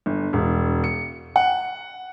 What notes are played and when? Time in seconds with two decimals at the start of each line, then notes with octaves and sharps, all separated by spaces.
0.06 G1
0.33 E1
0.84 C#7
1.36 F#5